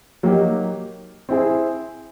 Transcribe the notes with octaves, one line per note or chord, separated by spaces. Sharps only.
F#3 A#3 D#4 G4
C4 E4 G#4